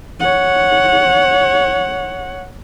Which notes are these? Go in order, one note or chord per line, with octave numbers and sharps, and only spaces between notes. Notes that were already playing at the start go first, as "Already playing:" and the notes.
C#5 F#5